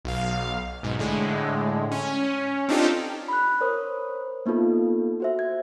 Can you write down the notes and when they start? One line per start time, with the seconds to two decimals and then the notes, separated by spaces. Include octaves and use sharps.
0.05 B1 F5
0.83 B1 G#2
0.99 A2 D3 G#3
1.91 C#4
2.69 C4 D4 D#4 F4 G4 A4
3.28 B5 F#6
3.61 A#4 C5 C#5 D#6
4.46 A#3 B3 D#4 F4 A4
5.20 F#4 C5 E5
5.39 G#6